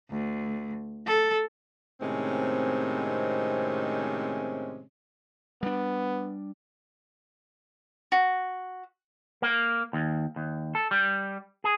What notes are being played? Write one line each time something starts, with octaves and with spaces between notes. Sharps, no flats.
D2
A4
A2 C3 D#3 G#3 C4 C#4
G3 B3 D4
F#4
A#3
D#2
D#2
A4
G3
G#4